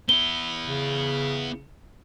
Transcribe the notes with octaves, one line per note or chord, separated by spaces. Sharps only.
B3 E4 G7
C#3